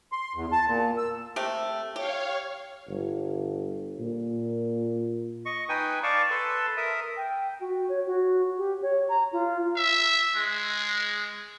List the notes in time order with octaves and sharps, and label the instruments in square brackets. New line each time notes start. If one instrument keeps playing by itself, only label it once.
[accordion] C6
E2
A5
A#2
E6
[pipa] C3 A3 G4
[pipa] G4 [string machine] C#5 F5
[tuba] G1
A#2
[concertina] D#5 C#6
D#4 B4 G5 G#5 D#6
D5 F5 A5 C#6 D6
A4 B4 A5 C6
A#4 E5 D#6
[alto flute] G5
F#4
C#5
F#4
G4
C#5
A#5
F4
[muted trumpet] E5
G#3